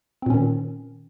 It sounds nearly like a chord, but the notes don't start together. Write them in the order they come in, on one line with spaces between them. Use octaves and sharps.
C4 A#2 C#4 D#3